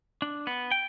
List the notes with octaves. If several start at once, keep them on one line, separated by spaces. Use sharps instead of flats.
D4
B3
G5